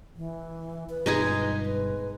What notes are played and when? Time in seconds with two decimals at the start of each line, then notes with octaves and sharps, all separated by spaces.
0.17 E3
0.90 B4
1.06 G1 G2 B2 G#3 D#4 G#4
1.65 B4